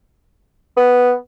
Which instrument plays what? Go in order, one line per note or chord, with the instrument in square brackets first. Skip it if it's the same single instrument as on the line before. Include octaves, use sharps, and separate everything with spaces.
[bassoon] B3